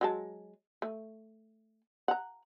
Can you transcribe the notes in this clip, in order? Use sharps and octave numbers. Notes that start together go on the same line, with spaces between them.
F#3 G#3 A5
A3
F#5 A#5